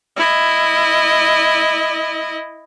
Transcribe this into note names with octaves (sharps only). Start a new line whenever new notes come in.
E4 D#5